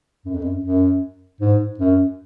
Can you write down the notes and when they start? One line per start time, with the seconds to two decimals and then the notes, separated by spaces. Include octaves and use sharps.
0.26 F#2
0.34 F2
0.41 F#2
0.64 F#2
1.41 G#2
1.80 F#2